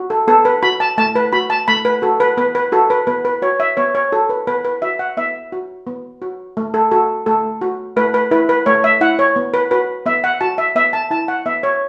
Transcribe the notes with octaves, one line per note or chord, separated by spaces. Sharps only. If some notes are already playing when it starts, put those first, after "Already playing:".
Already playing: F#4
A4
B3 A4
B4
F#4 B5
A5
A3 A5
B4
F#4 B5
A5
A3 B5
B4
F#4 A4
B4
B3 B4
B4
F#4 A4
B4
B3 B4
B4
F#4 C#5
E5
B3 C#5
C#5
F#4 A4
B4
B3 B4
B4
F#4 E5
F#5
B3 E5
F#4
B3
F#4
A3
A4
F#4 A4
A3 A4
F#4
A3 B4
B4
E4 B4
B4
A3 C#5
E5
E4 F#5
C#5
B3
B4
F#4 B4
B3 E5
F#5
F#4 A5
E5
B3 E5
A5
E4 A5
F#5
B3 E5
C#5